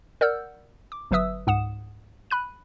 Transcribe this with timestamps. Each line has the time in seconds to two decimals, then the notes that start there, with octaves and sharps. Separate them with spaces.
0.21 A#4 D5 F#5 E6 F6 G6
0.92 D6
1.11 G1 F#3 B4 E5 D#6 E6
1.47 C#2 G#2 F#5 D#6 E7
2.31 B5 F#6 D#7